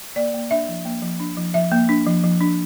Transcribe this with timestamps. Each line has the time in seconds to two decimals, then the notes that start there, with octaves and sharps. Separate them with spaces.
0.16 A#3 D5
0.34 A#3
0.51 D4 E5
0.68 F3
0.85 A#3
1.02 F3
1.20 D4
1.37 F3
1.54 F3 E5
1.72 A#3
1.89 D4
2.06 F3
2.24 F3
2.41 D4